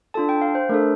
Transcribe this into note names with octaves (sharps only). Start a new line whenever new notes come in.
D4 F4 A4 A5
G5
F5
C5
A3 D4 A4 A#4